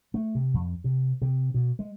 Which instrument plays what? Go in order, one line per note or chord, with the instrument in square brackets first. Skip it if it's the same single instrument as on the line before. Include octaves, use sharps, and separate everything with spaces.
[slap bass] A3
C3
F2
C3
C3
B2
G#3